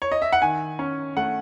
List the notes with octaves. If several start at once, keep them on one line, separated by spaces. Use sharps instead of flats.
C#5
D#5
E5
F#5
D#3 G#5
C#4
A3 F#5